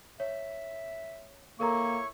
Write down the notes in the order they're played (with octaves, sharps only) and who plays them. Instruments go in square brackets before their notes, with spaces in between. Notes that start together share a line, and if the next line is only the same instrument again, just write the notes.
[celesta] C#5 [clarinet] E5
[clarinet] A#3 [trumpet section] E4 C#5 C#6 [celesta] A4 A#4 A#5